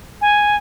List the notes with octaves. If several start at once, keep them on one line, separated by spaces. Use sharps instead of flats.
G#5